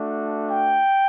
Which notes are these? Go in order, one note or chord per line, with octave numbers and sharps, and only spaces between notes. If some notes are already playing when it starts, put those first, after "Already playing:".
Already playing: A3 D4 F#4
G5